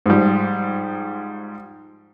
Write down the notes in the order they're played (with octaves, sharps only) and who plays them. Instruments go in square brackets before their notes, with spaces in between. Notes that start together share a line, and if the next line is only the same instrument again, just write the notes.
[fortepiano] G#2 F3 G3